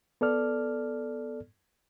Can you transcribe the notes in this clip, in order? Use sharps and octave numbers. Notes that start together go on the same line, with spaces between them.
B3 A4 D5 F6